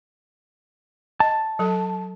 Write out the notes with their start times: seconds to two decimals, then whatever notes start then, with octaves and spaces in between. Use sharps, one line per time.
1.20 D#5 A5
1.59 F#3 A4